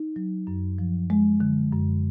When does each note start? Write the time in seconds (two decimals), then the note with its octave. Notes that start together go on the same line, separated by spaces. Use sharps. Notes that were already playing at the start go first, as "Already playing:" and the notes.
Already playing: D#4
0.16 F#3
0.47 F#2
0.78 F3
1.10 G#3
1.40 D3
1.73 F#2